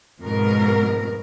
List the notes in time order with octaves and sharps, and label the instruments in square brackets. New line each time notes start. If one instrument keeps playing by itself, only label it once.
[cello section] F2 G#2 B2 A#4